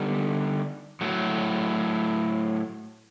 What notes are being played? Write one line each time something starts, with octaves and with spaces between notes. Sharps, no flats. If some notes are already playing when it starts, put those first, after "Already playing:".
Already playing: D3 G3 B3 D#4
A2 F#3 A3